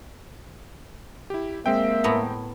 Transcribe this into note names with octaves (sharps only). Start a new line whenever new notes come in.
E4 G4
G#3 A#3 C4 E5 G5
A2 B3 A#5